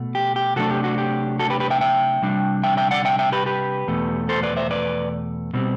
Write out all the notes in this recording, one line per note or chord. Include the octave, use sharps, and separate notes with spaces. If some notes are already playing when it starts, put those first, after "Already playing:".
Already playing: B2 A3
G4
G4
C3 F#3 A3 D4 F#4 A4
G4
F#4
G4
F#4 A4
G4 B4
G4 B4
E5 G5
E5 G5
C3 G3 D4
E5 G5
E5 G5
D5 F#5
E5 G5
E5 G5
G4 B4
G4 B4
E2 B2 A3
A4 C5
B4 D5
C5 E5
B4 D5
B2 G3 C4